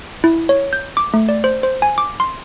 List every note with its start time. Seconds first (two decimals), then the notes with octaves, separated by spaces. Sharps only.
0.24 E4
0.49 C#5
0.73 G6
0.97 D6
1.14 A3
1.29 D5
1.44 C5
1.63 C5
1.82 G#5
1.98 D6
2.20 C6